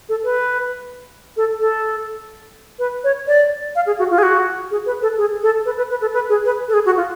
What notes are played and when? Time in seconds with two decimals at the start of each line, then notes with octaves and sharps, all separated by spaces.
0.09 A4
0.24 B4
1.37 A4
1.60 A4
2.79 B4
3.04 C#5
3.27 D5
3.75 F5
3.86 G#4
3.99 F#4
4.11 F4
4.18 G#4
4.23 F#4
4.71 G#4
4.86 B4
5.02 A4
5.18 G#4
5.43 A4
5.65 B4
5.77 B4
5.90 B4
6.01 A4
6.14 B4
6.29 G#4
6.45 B4
6.68 A4
6.74 G#4
6.86 F#4
6.97 F4